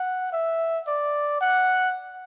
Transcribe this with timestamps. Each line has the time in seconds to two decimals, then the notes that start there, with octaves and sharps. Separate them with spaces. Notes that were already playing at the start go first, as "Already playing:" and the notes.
Already playing: F#5
0.32 E5
0.87 D5
1.41 F#5